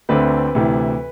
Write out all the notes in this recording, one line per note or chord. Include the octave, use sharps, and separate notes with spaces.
D2 D3 A3 C4 B4
D2 C3 E3